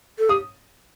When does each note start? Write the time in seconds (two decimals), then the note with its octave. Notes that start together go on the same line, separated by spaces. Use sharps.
0.19 A4
0.29 G4 D#6